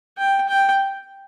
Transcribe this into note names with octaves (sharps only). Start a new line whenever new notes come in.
G5
G5